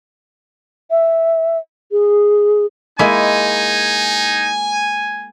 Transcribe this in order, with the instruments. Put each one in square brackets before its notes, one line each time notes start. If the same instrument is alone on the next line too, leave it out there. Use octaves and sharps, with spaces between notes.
[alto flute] E5
G#4
[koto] G#3 A#3 E4 [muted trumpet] D#4 [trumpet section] G#5